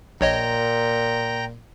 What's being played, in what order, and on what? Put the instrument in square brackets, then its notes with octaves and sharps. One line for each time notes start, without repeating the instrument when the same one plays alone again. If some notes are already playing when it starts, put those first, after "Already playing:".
[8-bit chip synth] A#1 C#5 D#5 [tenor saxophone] A#2 [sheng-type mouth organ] G5 A#5